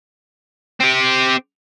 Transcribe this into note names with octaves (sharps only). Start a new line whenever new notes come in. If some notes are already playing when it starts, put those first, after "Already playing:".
C4 G4